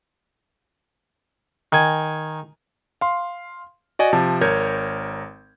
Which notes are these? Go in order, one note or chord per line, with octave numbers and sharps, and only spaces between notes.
D#3 G#5
F5 C6
F#4 D5 D#5 G#5
C3 F3 A5
G#1 A#4 C#5 G6 G#6